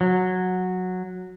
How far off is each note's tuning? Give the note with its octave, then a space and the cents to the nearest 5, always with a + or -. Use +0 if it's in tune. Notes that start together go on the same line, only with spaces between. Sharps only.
F#3 -10